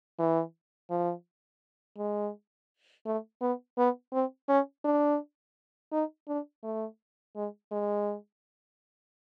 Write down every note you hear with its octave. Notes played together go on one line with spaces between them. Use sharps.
E3
F3
G#3
A3
B3
B3
C4
C#4
D4
D#4
D4
A3
G#3
G#3